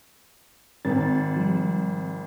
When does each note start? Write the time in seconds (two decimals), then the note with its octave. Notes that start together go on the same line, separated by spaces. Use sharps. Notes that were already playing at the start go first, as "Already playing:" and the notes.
0.85 G#1 A6
1.36 F3 G3